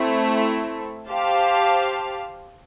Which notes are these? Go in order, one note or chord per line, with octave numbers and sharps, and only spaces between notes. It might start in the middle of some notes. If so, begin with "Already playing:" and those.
Already playing: A3 C4 E4
G4 C5 F5 A5